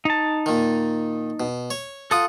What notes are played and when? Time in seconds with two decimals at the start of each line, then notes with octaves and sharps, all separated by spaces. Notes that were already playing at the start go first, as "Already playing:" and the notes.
0.05 D#4 A5
0.46 A#2 D#3
1.40 B2
1.71 C#5
2.11 F4 A4 F#5 D#6